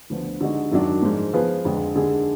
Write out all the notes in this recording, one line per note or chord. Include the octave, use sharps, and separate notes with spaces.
D2 D3 F3 B3
D3 G#3 D#4 F#4
F#2 D#3 F#3 D4
G#2 F3 G#3
F3 B3 F4 G#4 B4
F2 D3 G#3
D#2 D3 G#3 D4 G#4